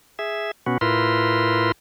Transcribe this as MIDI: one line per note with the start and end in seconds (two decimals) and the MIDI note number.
0.19 0.51 68
0.19 0.51 76
0.66 0.78 47
0.66 0.78 59
0.66 0.78 61
0.66 0.78 66
0.81 1.72 45
0.81 1.72 64
0.81 1.72 65
0.81 1.72 70
0.81 1.72 71
0.81 1.72 84